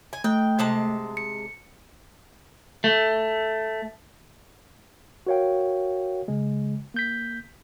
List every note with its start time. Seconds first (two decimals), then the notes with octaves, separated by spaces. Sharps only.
0.13 G#5
0.24 A3 G5
0.59 C3 G#3 A5
1.17 C#7
2.84 A3
5.27 F#4 A#4 C#5 F5 G5
6.28 C#3 G#3
6.94 A#3 G6 B6